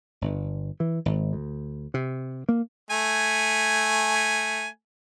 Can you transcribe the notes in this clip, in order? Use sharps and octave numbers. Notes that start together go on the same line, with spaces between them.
G1
E3
G#1
D2
C3
A#3
A3 G#5